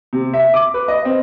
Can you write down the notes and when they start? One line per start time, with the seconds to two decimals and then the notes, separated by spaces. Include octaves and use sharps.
0.13 C3
0.34 E5
0.54 D6
0.74 B4
0.88 D#5
1.05 C4